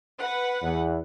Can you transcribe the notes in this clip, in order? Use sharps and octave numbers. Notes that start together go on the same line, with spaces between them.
B4 F#5
E2